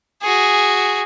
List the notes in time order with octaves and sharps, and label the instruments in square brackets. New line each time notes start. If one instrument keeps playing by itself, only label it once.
[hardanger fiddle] F#4 G#4